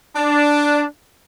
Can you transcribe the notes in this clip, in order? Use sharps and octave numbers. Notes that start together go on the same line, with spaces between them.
D4